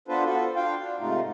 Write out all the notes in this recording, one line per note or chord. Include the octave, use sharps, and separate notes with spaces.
B3 D4 F4 A4 B4 C5
F4 F#4 A4
D4 F4 F5 G5
D4
G#2 C3 A3 D#4 F4